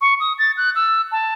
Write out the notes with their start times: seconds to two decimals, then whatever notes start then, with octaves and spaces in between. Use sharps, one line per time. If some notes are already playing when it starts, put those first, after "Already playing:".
0.01 C#6
0.20 D#6
0.39 A6
0.57 F#6
0.76 E6
1.12 A5